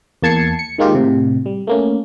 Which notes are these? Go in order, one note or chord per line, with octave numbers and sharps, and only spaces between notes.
E2 A#3 A5 G#6 C7 C#7
C#7
D#3 G#3 A#3 D#4 F4 G4
A2 C3
G3
A3 A#3 C#4